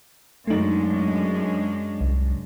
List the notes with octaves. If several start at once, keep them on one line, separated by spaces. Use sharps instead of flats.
F#2 G#3 A3 D4 D#4
C2